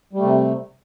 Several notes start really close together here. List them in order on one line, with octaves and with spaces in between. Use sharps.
G3 A3 C3